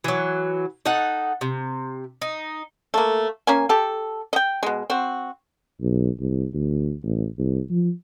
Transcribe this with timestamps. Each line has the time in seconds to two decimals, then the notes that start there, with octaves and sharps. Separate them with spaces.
0.04 E3 F#3
0.85 D#4 A4 F#5
1.41 C3
2.22 D#4
2.94 A3 A#3
3.47 A#3 C#4 G#5
3.69 G4 A4
4.33 D#5 G5
4.63 B2 G#3
4.90 C4 F#4
5.81 B1
6.20 C2
6.53 D2
7.03 A1
7.38 C2
7.70 F3